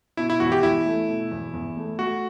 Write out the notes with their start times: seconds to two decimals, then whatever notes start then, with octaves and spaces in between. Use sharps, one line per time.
0.17 B2 E4
0.30 E4
0.40 E2 F#4
0.52 G4
0.63 E2 E4
0.86 A3
1.08 B2
1.31 E2
1.53 E2
1.77 A3
1.99 A3 F#4